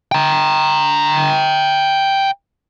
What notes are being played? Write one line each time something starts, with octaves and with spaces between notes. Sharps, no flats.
G5 A#5